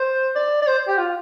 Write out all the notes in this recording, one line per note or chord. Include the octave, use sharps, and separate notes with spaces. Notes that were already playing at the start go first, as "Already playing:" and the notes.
Already playing: C5
D5
D5
C5
G4
F4